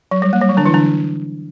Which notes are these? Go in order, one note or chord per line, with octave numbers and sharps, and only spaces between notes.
F#3
G3
A#3
G3
F#3
D3 D4
E3 E4
D3 D4